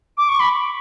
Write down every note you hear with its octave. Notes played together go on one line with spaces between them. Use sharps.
D6
C#6
B5